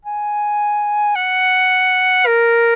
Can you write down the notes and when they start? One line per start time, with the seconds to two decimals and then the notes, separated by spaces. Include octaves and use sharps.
0.05 G#5
1.16 F#5
2.27 A#4